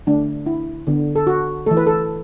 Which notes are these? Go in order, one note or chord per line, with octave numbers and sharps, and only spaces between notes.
D3 A3 D4
E4
D3 B3
A4
F#4
E3 A3 A4
B4
A4